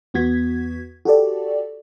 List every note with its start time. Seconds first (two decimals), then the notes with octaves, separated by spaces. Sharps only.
0.14 E2 B3 F#4 G#6 B6
1.05 F#4 G4 A4 D5